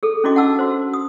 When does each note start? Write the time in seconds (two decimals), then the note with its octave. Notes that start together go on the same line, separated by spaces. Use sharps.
0.03 G#4 A4
0.24 C#4 D4 E4 F#4 D#5 D6
0.36 F#5 A5 E6
0.59 F#4 C5
0.93 D#6